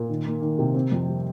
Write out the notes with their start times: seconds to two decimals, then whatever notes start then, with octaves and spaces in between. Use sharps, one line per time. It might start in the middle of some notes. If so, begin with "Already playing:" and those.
Already playing: A#2
0.09 D#3
0.26 A#3
0.42 D#3
0.59 C3
0.74 C4
0.92 F2
1.08 G3